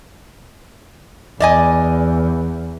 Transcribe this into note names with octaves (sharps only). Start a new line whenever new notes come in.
E2 D5 D#5 G#5